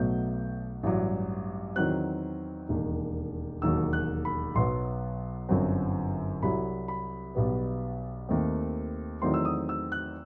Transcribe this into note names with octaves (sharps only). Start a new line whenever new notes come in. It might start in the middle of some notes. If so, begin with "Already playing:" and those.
Already playing: B1 B2 F#3 A3 G6
A1 G2 F#3
E2 D#3 F#3 C4 F#6
E1 D#2 D#3
E1 D#2 D#3 F#3 E6
F#6
B5
B1 B2 F#3 B3 C6
G1 F#2 F#3 C4
C2 C3 F#3 B5
B5
B1 B2 G3 B3
D#2 D#3 A3 C4
E2 D#3 F#3 A3 C4 C6
E6
D#6
E6
F#6